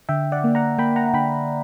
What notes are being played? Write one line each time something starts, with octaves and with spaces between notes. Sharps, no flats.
D3 E5 G5
D5 F#5
A#3
F#5 A#5
A#3 G5 B5
F#5 A#5
D3 G5 B5